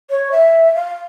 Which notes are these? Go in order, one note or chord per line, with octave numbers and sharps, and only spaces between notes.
C#5
E5
F5